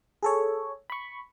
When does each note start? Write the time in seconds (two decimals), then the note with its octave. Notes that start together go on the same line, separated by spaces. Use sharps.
0.23 G#4 A4 C#5
0.90 B5 C#6